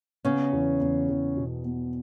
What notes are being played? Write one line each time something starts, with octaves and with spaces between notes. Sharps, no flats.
C#3 B3 C#4
E2
E2
E2
B2
B3